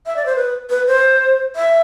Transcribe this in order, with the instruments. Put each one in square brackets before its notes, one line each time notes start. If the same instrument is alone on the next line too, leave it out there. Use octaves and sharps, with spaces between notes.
[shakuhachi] E5
D5
C5
B4
B4
C5
E5